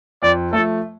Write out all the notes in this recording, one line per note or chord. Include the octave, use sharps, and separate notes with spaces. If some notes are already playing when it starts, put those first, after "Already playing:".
F2 D5
F3 A3 A4